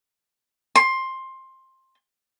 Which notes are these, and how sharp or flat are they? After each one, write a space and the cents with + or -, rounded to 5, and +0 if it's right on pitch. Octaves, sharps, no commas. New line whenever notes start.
C6 +15